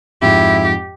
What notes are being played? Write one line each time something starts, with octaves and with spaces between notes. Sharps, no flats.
F2 G#2 E4 G4